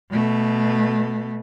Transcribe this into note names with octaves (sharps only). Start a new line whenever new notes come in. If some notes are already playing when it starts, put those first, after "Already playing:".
B2 A3